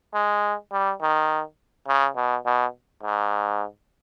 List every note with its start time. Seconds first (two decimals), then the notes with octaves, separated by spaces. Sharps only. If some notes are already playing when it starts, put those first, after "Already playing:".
0.14 G#3
0.72 G3
1.01 D#3
1.88 C#3
2.16 B2
2.46 B2
3.03 G#2